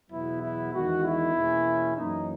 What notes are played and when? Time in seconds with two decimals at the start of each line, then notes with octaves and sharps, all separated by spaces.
0.10 E2 B2 F#3 B3 E4
0.42 E4
0.73 E2 D#3 G#3 F#4
1.03 E4
1.35 E2 B2 A#3 C#4
1.96 F#2 E3 A#3 C#4 D#4